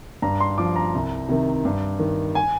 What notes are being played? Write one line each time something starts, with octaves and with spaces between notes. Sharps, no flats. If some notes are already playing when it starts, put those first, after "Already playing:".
G2 A#5
C6
F3 D6
A#5
C2
C3 D#3
G2
D#3
G#5